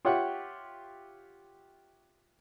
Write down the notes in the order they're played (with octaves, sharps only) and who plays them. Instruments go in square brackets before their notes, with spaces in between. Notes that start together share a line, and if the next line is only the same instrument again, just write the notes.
[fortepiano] F4 G4 C#5 E5 F#5 G5